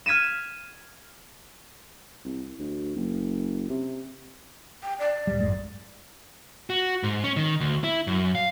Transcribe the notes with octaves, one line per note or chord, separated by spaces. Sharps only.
F6 G#6 B6 D#7 E7
C2
D2
F#1
C3
G5
D5
D1 G3
G#1 F#2 G#3
F#4
G#2
C#4
D#3
D2
E4
F#2
F5